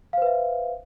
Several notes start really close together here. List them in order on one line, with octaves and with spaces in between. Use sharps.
F5 C5 B4 E5